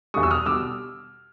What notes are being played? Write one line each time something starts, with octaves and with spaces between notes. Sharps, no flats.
E2 B2 G3 C#6 D#6
E6
D#6 F6
B2 G3 D6 E6